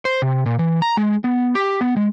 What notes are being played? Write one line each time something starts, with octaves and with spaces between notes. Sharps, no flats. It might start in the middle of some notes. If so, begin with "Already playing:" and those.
C5
C3
A#2
E3
A#5
G#3
B3
G4
B3
G#3